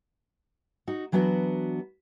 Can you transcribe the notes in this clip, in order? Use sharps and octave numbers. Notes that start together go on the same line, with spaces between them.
D#4 F#4
E3 F#3 B3 D4 F#4